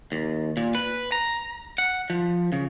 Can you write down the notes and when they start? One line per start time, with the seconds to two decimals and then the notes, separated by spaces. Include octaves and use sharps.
0.12 D#2
0.57 A#2
0.75 B4
1.12 A#5
1.78 F#5
2.10 F3
2.52 C#3